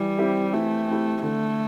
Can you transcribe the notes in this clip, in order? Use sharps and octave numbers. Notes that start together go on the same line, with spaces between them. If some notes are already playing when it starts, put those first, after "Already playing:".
Already playing: E3 G3
C4 E4 G4
E3 A3
C4 E4 G4
D3 A3